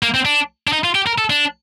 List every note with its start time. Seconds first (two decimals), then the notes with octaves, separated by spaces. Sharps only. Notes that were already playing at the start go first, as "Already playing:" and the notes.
0.03 A#3
0.14 C4
0.25 D4
0.67 D4
0.73 D#4
0.84 F4
0.95 G4
1.07 A#4
1.18 A4
1.30 D4